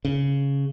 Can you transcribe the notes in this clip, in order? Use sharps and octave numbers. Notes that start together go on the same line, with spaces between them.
C#3